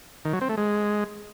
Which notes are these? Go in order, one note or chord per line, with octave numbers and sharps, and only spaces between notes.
D#3
F#3
C4
A3
G#3